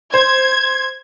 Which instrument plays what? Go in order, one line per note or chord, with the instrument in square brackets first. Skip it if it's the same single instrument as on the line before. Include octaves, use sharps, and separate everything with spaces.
[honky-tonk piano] C5 [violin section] G#6